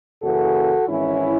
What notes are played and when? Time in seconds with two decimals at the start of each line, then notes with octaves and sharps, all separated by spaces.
0.22 F#1 F#2 C#3 E3 F#4 A4
0.88 G#1 G#2 E3 C#4 E4